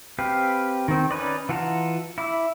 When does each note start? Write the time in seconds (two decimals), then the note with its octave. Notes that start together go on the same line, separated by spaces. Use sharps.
0.18 C4 G4 B4 F5
0.88 D#3 C4
1.11 C#4 D#4 B4 D5
1.49 E3 F4 F#5 A5 A#5
2.18 E4 E5 D6